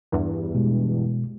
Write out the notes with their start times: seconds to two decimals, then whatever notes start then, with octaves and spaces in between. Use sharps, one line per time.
0.12 E2 G2 E3
0.55 B2 G#3